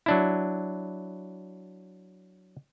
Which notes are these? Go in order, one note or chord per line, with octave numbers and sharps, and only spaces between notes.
F#3 D4 E4